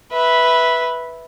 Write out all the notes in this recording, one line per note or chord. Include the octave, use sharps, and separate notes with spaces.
B4 E5